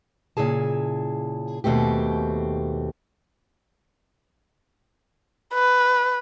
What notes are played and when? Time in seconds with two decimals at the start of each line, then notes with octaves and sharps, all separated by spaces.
0.37 A#2 C#3 E4 G#4 A5
1.64 D#2 B2 A3 C4 G4
5.54 B4